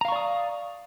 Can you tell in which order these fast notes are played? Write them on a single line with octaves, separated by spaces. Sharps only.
A#5 F5 C#6 D5 D#6